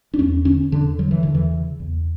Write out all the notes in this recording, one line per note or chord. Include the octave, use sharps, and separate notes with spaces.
D4
E2 C#4
D3 C#4
E2 D3
D3 F#3
E3
E2 D3
E3
C#3
E2